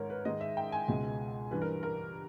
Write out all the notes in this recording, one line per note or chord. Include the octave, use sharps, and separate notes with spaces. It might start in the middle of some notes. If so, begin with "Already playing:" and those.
Already playing: G#2 D#3 G#3 A#4 C#5
B4
G#2 D#3 G#3 D#5
E5
G5
G#5
C#2 B2 G#3
G2 E3 G3 B4
A#4
A#4